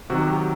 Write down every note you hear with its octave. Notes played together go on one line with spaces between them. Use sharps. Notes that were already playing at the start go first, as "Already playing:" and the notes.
C3 D#3 F#3 F#4
G4